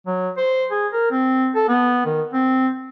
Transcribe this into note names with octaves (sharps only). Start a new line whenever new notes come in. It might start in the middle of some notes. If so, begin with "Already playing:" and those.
F#3
C5
G#4
A#4
C4
A4
B3
D#3
C4